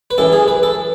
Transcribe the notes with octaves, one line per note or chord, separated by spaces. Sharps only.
B4
F#2 E3 A4
G#4
B4
A4